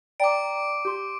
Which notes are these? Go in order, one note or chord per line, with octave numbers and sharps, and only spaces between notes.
D5 G5 A#5 D6 D7
G4 C6